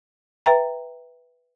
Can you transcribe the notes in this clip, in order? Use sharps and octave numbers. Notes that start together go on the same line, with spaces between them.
B4 E5 G5 A#5